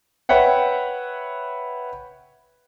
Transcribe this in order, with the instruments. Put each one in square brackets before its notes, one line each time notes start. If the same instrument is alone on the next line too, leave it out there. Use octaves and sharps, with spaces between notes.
[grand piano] B4 C#5 E5 F#5 G5